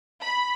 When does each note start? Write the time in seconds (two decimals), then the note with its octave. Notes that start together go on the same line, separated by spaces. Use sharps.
0.21 B5